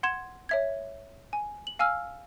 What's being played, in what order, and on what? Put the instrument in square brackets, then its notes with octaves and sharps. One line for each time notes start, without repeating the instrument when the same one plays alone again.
[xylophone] F#5 C6 G#6 E7
C#5 E5 G#6
G#5
F#7
F5 G#5 E6 F6